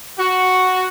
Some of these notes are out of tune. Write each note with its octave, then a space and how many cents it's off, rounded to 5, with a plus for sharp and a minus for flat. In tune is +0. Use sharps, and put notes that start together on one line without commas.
F#4 +0